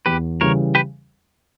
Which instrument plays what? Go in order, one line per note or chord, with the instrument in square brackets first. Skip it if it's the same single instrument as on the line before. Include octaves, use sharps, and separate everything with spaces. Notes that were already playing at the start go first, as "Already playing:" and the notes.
[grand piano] E2 [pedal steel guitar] G4 B4
[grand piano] C#3 E3 G3 [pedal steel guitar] A#4 C#5
[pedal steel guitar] G4 B4